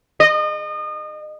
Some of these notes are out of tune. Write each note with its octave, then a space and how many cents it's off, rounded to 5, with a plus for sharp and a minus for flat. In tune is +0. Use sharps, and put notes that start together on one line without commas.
D#5 -30